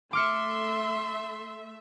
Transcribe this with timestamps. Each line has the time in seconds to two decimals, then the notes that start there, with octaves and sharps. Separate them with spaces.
0.13 A3 E5 C6 D6 F6 C#7